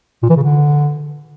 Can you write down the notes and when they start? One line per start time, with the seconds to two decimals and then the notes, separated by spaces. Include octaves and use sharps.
0.23 A#2
0.29 E3
0.36 C#3
0.43 D3